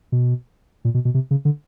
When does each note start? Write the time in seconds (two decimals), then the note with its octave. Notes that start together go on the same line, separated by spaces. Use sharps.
0.12 B2
0.85 A#2
0.94 B2
1.05 B2
1.14 C3
1.31 C#3
1.45 D3